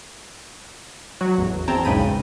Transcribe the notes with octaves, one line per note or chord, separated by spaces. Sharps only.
F#3 F#4
A1 E2
E2 C4 G5 A5 A#5 G#6
B1 G#2 C#3 G5 B5 D#7